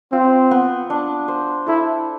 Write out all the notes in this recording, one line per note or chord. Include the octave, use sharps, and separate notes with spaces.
C4 F4
B3
D4
C5
E4 A4